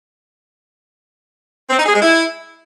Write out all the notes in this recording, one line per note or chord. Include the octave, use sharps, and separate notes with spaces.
C4
D#4
G#4
G#3
E4